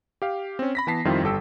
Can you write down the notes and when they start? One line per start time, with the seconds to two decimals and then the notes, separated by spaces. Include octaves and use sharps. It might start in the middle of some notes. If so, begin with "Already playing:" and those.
0.22 G4 F5
0.59 C4 C#4
0.75 B5 A#6 B6
0.87 E3 B3 A5 B6 C7
1.05 F2 D#3 G3 C4 E4 F4
1.23 G1 G3 A4 G5 E6